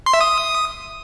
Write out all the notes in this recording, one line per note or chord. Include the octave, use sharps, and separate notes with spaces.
C6
E5
D#6